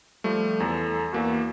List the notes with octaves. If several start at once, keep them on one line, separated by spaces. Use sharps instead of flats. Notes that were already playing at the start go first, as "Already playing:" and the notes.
F3 G3 A3
E2 A4
E2 A#3 F#4